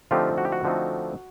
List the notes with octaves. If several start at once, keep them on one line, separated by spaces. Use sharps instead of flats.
D3 F3 A3 C4 D#4 F4 G4
F#4
G4
F#4
D3 F3 A3 C4 D#4